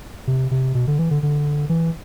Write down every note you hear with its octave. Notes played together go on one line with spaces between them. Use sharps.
C3
C3
B2
D3
E3
D3
D3
E3